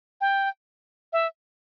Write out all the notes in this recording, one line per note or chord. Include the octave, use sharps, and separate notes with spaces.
G5
E5